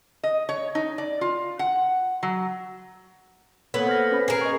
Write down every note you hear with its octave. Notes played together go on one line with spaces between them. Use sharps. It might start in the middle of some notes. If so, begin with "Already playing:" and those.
D#5
C#5
D#4
D5
F4
F#5
F#3
A#3 B3 A4 C#5
C5 F6 A#6
C#4 B4 B5
G#4 A#4 C7
D#5 C#6